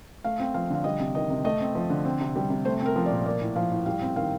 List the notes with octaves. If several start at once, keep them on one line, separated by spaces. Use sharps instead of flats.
A3 F5
C4
F3 F5
D3 F5
G3 D#5
C3
D#3 D#5
C3
A3 D#5
C4
F3
D3
C4
C3
G3
C3
A3 C5
C4
A#4
F3
D5
A#2
A#3 D5
A2
F3 F5
A2
G3 F5
C4
D#3 F5